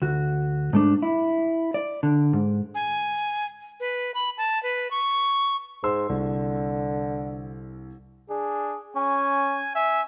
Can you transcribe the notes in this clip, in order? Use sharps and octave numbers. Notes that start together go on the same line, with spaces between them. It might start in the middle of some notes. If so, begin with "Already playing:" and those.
D2 F#4
G#2 A3 D4
E4
D5
D3
G#2
G#5
B4
B5
A5
B4
C#6
G#2 C6 E6
C2 D3
D4 G#4
C#4 G#5
E5 G#5